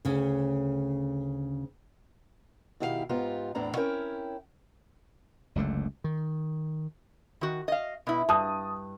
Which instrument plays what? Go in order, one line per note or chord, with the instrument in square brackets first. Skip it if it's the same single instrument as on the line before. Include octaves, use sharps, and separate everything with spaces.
[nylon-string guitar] D2 C#3 C#4
[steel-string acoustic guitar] B2 D#3 E4 G4 C5 F5
G#2 B3 F4 G4 A#5
E2 A2 E3 C4 D4 A#5
C4 C#4 E4 A#4 C#5 G5
[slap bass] F#1 C#2 D3 A3
D#3
[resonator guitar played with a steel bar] D#3 F#4
D#5 F5
B2 E4
[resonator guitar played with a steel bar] G2 [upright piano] A5 D#6